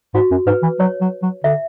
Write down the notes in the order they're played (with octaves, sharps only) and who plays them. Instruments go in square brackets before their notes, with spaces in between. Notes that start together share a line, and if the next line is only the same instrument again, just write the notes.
[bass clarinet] G#2 [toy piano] F#4
[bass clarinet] F#2
[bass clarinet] G#2 [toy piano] B4
[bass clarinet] E3
[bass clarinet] F#3 [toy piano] C#5
[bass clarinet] F#3
F#3
[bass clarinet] D3 [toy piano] E5